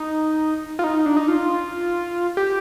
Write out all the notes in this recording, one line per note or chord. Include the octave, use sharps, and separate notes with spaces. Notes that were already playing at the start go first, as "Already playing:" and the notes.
Already playing: D#4
F4
D#4
D4
D#4
F4
G4